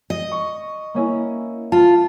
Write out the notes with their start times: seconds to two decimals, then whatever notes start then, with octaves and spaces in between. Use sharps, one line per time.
0.10 D#5
0.31 C#6
0.94 A#3 C#4 E4
1.72 F4 A5